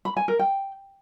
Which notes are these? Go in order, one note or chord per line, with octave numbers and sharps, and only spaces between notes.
B5
G#5
A#4
G5